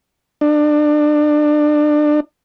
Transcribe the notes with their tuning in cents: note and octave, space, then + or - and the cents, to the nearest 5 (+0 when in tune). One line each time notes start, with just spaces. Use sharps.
D4 +25